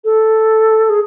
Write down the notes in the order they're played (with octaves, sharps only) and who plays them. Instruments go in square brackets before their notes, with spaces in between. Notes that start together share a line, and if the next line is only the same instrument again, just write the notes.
[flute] A4
G#4